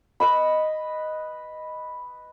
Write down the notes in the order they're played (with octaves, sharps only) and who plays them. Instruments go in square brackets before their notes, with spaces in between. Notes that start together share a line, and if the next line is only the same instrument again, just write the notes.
[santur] B4 D#5 B5